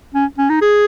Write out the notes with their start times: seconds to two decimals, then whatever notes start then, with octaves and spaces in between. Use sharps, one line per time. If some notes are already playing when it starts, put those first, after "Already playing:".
0.15 C#4
0.38 C#4
0.49 D#4
0.61 G#4